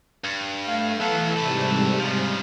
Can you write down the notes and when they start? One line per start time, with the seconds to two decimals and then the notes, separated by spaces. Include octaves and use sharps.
0.24 G2
0.65 A3 F5
1.00 E3 F#3 B3 A4 F5
1.37 G#2 C3 G3 A3 B4 A5
2.00 C#3 F3